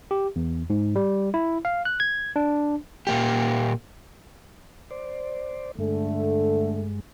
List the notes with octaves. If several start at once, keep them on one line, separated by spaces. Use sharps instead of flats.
G4
E2
G#2
G3
E4
F5
F#6
G#6
D4
A#2 A#3 G4
C5 D5
G2 D3 G#3 A3